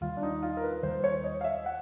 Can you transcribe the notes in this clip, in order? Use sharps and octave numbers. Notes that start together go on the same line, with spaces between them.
D#2 D#3 G3 F4
D4
D#4
F4
A#4
B4
D#2 D#3 G3 C5
C#5
D#5
F5
E5
F#5